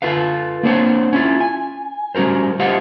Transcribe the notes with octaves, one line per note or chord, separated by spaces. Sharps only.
F4 A4 B4 F5
A#3 C4 D4 C5 C#5 F#5
C#4 E4 F4
G#5
G3 C#4 F#4 A#4 C5
F4 G4 C5 D#5 F5 F#5